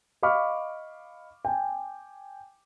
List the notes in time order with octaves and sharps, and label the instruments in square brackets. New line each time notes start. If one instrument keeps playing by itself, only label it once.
[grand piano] D#5 F5 B5 C#6 D6 F6
G5 G#5